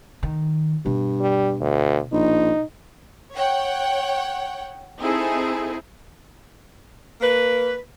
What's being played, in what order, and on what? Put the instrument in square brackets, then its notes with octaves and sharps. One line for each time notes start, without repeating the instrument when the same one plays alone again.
[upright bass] D#3
[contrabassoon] G2 [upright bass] B2
[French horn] G3
D2
[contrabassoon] A#1 [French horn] D#4
[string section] C#5 F#5 G5
C4 D#4 E4 G#4 A4
[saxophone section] A#3 B4